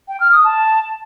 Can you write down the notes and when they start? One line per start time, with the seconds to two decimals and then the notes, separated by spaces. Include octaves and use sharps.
0.08 G5
0.20 F6
0.32 D#6
0.44 A5